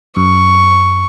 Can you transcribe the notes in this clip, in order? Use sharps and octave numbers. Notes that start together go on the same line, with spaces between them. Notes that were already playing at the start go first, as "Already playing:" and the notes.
F#2 C#6